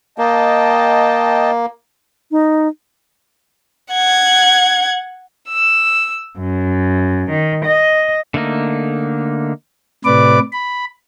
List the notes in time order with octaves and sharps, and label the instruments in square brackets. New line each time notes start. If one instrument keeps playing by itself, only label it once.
[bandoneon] A#3 [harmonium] D#5 G5 A5
[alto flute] D#4
[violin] F#5 G#6
[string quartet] E6
F#2
D#3
D#5
[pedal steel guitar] D3 A3 A#3 D#4
[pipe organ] A2 C3 B4 D5 D6
B5